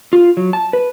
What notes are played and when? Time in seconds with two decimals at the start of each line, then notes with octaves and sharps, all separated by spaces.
0.13 F4
0.37 F#3
0.53 A5
0.73 B4